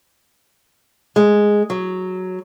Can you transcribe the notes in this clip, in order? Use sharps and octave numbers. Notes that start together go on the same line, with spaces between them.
G#3
F#3